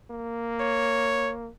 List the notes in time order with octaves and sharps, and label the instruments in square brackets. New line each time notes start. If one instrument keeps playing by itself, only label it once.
[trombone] A#3
[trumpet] C#5